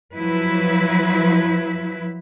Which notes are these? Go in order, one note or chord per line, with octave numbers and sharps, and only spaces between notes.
F3 F#3 E4 B4